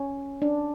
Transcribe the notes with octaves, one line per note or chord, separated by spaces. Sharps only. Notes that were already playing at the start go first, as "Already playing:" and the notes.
Already playing: C#4
D4